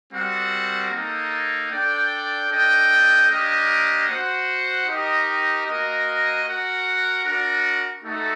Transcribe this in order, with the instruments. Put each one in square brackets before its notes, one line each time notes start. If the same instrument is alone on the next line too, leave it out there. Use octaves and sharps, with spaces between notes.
[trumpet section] G3 C4 F#4 A#4 F#5
A#3 D#4 A4
D4 A4 D5 G5
D4 A4 D#5 G5
A#3 D4 G4 A#4 D#5
F#4 C5 F#5
D#4 G4 A#4 D#5 G5
A#3 F#4 A#4 D#5
F#4 A#4 F#5
D4 F#4 A#4 F#5
A3 D#4 F#4 A4